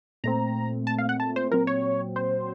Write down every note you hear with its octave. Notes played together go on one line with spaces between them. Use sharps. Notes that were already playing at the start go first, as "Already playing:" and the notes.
A#2 A3 C4 A#5
A5
F5
F#5
A5
C5
A#2 F#3 C4 A#4
C#5
C5